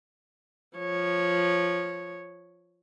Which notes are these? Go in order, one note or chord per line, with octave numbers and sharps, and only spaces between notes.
F3 C#5